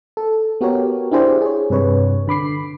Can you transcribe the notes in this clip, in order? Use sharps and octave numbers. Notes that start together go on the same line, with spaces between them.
A4
B3 F#4 G4 A#4 C#5
D4 E4 G4 G#4 C5 D5
G#4 C#5
G2 C3 B4 C#5
D3 B5 D6 C7